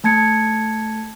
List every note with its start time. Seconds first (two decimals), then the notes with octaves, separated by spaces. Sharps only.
0.04 A3 A5 G#6 C#7